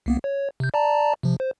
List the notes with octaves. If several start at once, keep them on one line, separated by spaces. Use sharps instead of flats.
C2 A#3 B3
C#5
C3 G6
D5 A5 A#5
C3 F3
C5